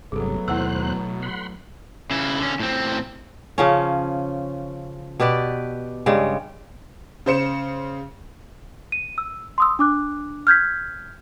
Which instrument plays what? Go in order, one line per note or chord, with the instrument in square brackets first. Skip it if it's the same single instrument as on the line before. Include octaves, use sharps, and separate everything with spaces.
[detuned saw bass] G1 [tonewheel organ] G2 C3 [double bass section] F#3 A3 B3 [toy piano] G#4 A4
[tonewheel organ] D#2 C5 F#6 [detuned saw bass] B2 [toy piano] E4 F#5 E6
[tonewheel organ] F#5 B5 C6
[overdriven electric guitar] C#3 E4
D3 C#4
A2 C4
[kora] C#3 F3 C#4
B2 G4 B4 D5
G2 C#3 G3 G#3
[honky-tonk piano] C#3 C5 C#7 E7
[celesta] D#7
E6
C6 D#6 E6
D4 D6 F#6
F6 G6 G#6 B6